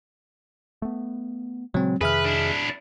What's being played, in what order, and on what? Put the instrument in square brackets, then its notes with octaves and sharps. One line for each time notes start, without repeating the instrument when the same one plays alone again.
[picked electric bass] A3 B3
[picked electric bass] A#2 C#3 G#3 [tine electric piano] F#3 C4
[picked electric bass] F2 C3 D#3 [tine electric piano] G#4 E5 F6 [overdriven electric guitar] B4
[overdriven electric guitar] D4 E4